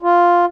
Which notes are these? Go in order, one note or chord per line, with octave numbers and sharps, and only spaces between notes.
F4